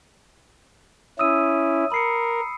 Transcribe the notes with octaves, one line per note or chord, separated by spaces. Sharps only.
C#4 E4 D#6 E6 D#7
A#4 B5 C7 C#7